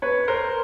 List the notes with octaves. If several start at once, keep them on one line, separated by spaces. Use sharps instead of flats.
B4 C#5
A#4 C5